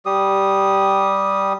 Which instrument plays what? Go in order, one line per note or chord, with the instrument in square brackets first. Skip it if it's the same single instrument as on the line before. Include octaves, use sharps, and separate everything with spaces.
[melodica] G3 G4 D#6